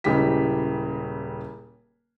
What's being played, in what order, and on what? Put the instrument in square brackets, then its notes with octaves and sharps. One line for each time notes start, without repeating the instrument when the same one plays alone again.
[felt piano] D#1 C#3 E3 G#3 G4 B6